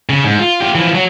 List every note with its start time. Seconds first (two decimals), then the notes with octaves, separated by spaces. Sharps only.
0.09 C#3
0.24 G#2
0.39 F4
0.60 F4 G4
0.75 E3 F3
0.95 F#3